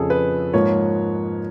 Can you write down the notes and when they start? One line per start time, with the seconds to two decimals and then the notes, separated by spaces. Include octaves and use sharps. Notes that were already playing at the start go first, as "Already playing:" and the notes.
Already playing: F2 C#3 F3 G#4 A4
0.10 B4
0.53 G#2 F3 A#3 C#5